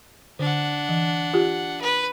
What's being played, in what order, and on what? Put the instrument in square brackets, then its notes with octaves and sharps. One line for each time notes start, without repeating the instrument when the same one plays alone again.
[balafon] D3 [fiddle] D4 F#5
[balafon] E3
F4 G4
[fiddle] B4